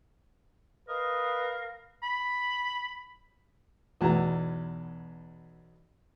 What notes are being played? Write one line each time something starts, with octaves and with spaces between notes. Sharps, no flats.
A#4 B4 D#5 F5
B5
B1 E2 E4 F#4 A#5